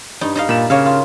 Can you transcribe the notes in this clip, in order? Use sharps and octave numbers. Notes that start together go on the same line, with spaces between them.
G2 D#4
D#4 D#5 F5
A#2 B5 E7
C#3 A#3 C#5 F5
F4